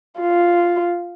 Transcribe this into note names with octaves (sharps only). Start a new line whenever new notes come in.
F4